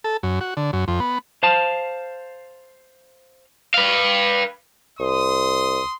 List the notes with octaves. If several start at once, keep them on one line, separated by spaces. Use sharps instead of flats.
A4
F#2
F#4
D3
F#2
F2
B3
C5 F5 A5
B4 F5
C2 C6 D#6